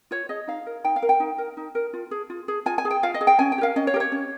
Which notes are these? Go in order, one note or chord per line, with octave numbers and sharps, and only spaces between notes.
F4 C#5
G#4 D#5
D#4 F5
A#4
D#4 G5
F5
A#4
G5
D#4
A#4
D#4
A#4
F4
G#4
F4
G#4
F4 G#5
G#5
G#4
G5
F4 F5
D#5
G#4
G5
C#4 G#5
G5
G4
A#4 F5
C#4 D#5
C#5
G4 A#4
C#5
C#4